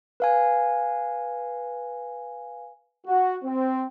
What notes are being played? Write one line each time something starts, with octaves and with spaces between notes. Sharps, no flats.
B4 F5 G#5
F#4
C4